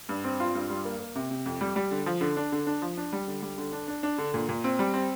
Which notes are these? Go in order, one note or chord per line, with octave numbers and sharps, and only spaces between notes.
G2
C4
F4
G2
G3
A#3
A#3
C3
C3
F2
G3
G3
D3
F3
D3
D4
D3
D4
F3
D4
G3
D3
G3
D3
D4
D4
D4
D3
A#2
A#2
C4
G3
C4